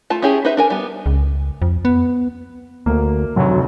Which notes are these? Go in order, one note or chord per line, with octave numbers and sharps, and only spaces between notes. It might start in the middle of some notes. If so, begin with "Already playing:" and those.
A3 F4 A5
C#4 E4 G4 G#4
D#4 E4 B4 C5 E5
D4 A#4 G#5
G3 B3
C#2
F2
B3
D2 A#3
F1 D2 F#3